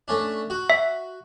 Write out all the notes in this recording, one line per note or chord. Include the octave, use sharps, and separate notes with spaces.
A3 C#4 D4
F#4
E5